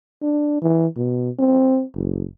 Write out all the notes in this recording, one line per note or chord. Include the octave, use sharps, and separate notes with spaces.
D4
E3
B2
C4
F#1